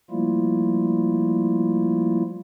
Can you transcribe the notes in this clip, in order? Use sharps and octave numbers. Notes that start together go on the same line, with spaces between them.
F3 G3 A3 A#3 E4 F4